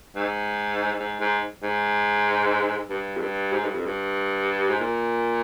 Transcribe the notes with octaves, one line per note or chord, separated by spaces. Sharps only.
G#2
G#2
G#2
G#2
G2
F2
G2
G#2
G2
F2
G2
G#2
A#2